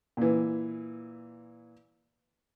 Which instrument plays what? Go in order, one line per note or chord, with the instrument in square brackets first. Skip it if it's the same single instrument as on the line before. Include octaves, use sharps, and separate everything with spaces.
[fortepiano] A#2 E3